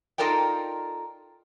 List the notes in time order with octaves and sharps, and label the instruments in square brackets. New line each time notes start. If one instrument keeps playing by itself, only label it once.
[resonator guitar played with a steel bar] D#4 F4 A4 A#4 D5 G5